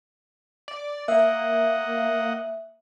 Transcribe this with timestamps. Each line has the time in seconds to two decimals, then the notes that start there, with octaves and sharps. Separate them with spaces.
0.68 D5
1.08 A#3 D#5 E5 F#5